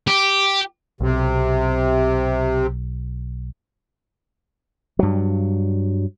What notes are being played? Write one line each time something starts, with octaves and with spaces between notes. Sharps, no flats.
G4
B1 C3
G2 F#3